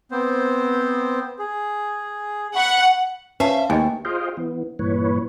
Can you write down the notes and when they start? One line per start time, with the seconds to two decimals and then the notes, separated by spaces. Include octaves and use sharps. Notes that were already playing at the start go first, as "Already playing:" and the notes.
0.11 B3 C4 C5
1.39 G#4
2.56 F#5 B5 C#6
3.40 C#4 B4 C5 E5 F5 A5
3.70 D#2 A3 D#5 G5 G#5
4.05 F4 G#4 C5 D#5 F5 G5
4.37 E3 B3
4.79 G2 A#2 E3 B4 C#5